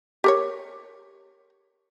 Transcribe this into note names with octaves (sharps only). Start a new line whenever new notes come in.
G4 A#4 C#5